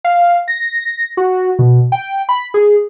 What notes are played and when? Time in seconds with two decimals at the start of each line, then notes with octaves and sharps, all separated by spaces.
0.04 F5
0.48 A#6
1.17 F#4
1.59 B2
1.92 G5
2.29 B5
2.54 G#4